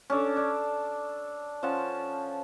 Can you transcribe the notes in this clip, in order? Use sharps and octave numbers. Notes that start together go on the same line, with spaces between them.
C#4 D4 A4 D5
D4
F3 C#4 F#5 A5